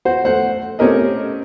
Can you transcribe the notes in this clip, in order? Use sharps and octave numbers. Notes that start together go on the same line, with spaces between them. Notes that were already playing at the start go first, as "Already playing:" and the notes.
F#4 C5
A3 C5 F#5
A3 C4 C#4 G4 A#4 D#5